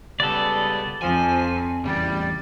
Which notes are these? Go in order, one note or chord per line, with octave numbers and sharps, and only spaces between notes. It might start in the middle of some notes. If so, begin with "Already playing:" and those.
C#2 C#3 G3 B3 A4 D5
F2 F3 C4 G#5
E2 C#3 G3 D5